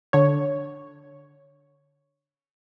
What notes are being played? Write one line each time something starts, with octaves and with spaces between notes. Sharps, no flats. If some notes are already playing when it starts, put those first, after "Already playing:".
D3 C#5